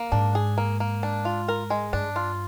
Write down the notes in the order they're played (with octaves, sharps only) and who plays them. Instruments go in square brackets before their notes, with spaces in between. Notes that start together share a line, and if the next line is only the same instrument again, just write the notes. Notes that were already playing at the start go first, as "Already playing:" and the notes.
Already playing: [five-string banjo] A#3
[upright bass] G#2 [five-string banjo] D4
[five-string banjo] G#4
A#3
A#3
D4
F4
A#4
G#3
[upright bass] G2 [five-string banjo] D4
[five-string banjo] F4